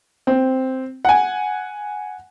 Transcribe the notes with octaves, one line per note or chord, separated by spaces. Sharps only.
C4
F#5 G#5